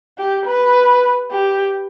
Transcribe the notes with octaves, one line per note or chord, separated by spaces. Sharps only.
G4
B4
G4